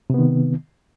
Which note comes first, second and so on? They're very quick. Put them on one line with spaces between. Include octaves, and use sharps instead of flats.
C3 B3 D#3